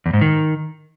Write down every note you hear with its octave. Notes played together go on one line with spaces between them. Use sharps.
E2
G#2
D#3